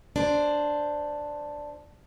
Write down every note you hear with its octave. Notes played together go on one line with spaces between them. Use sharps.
D4 C5